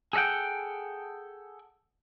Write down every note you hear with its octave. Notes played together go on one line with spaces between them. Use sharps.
G#4 A4 D#5 F#5 G5